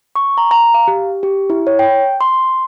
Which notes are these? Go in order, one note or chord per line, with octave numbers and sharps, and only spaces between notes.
C#6
A#5
A#5
F5
G4
G4
E4
C#5
G5
C6